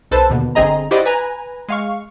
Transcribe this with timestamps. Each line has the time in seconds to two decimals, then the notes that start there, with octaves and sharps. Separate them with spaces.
0.11 B1 A4 B4 C5 A5
0.30 D#2 B2 D3
0.55 G1 D3 C4 G#4 D#5 A#5
0.91 E4 F#4 G4 C5 D5 D#5
1.05 B4 G#5 A#5
1.68 G#3 F5 C#6